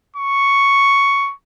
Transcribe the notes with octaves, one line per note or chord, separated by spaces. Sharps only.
C#6